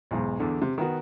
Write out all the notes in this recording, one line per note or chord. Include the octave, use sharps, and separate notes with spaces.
B1 E2 G#2
E2 D3
C3
D#3 B3 F#4